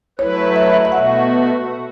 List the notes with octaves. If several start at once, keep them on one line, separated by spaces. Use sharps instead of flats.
F#3 A3 E4 B4 C#5
E5
E5
B2 A3 F#4 F#5